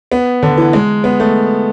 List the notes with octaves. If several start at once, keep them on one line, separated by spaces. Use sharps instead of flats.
B3
D3
E3
G#3
B3
A3